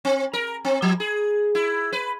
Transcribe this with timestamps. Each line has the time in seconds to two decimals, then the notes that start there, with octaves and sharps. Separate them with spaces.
0.05 C4
0.33 A#4
0.65 C4
0.82 F3
1.00 G#4
1.55 E4
1.93 B4